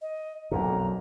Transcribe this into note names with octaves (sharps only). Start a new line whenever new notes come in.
D#5
B1 F2 A#2 A#5